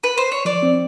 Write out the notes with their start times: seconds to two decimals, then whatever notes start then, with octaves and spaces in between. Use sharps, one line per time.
0.04 B4
0.18 C5
0.32 C#5
0.45 F3 D5
0.63 C4